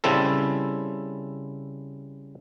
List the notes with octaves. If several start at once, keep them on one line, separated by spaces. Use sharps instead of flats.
C#3 G3 C4 E4 A4